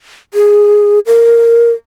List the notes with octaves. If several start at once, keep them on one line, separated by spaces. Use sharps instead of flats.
G#4
A#4